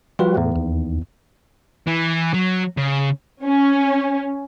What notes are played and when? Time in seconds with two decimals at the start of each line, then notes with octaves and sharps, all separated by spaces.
0.19 F3 G3 F4 F#4 B4
0.37 E2 A2
0.56 D#2
1.87 E3
2.34 F#3
2.78 C#3
3.44 C#4